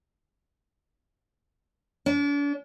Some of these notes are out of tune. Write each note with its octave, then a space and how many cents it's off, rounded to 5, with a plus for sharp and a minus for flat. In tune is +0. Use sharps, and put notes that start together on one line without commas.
D4 -40